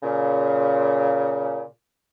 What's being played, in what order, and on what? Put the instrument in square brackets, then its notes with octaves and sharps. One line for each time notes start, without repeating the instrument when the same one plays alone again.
[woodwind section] A#2 C#3